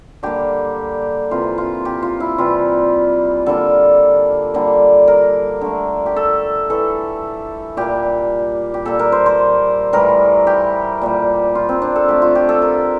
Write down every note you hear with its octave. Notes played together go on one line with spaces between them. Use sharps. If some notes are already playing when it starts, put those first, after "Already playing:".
D3 G3 A#3 G4
C3 E3 A#3 F4
F4
G4
F4
E4
C3 E3 G3 F4
D3 G3 A#3 A4
D3 G3 A#3
A#4
D3 A3
G4
A4
A2 E3 A3 A4
A#2 G3 A#3 G4
G4
A#2 G3 A#3 A4
A#4
C5
C5
A2 E3 G3 A#4
G4
A#2 G3 A#3
F4
C4
D4
A4
D3 A3 G4
F4
G4
A4
A#4